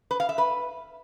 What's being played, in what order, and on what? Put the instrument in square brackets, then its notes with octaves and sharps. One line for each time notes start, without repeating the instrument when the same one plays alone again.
[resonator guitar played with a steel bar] B4
F5
E5
B4